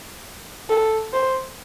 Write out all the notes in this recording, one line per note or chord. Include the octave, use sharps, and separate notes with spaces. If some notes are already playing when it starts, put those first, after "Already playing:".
A4
C5